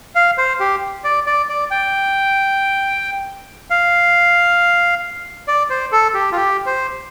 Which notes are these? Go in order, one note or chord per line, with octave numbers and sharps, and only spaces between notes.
F5
C5
G4
D5
D5
D5
G5
F5
D5
C5
A4
G4
F4
G4
C5